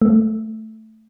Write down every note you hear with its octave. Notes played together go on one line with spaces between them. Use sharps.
A3